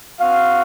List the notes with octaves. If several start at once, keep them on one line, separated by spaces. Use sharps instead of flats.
C4 F#4 F5